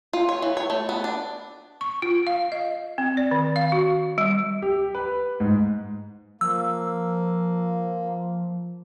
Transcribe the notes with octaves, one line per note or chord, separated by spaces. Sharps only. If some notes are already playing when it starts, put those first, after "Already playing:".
F4
C#5
E3
C#5
A3
B3
D4
C#6
F4
F5
D#5
C4
D5
D#3
F5
F#4
G3
G4
B4
G#2
F3 A#3 E6